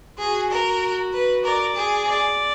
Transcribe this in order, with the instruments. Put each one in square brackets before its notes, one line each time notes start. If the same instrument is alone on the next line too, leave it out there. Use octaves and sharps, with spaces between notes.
[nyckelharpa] F#4 [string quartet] G#4
[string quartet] A#4
B4
[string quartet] A#4 [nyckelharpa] D5
[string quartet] G#4
[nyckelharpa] D5